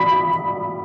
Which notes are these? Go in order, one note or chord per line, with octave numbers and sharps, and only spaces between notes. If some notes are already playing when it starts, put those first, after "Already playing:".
Already playing: B5